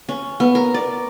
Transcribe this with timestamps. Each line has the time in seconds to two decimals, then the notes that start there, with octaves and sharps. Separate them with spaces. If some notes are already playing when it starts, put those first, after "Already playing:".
0.09 C#4
0.40 B3
0.55 A#4
0.74 D5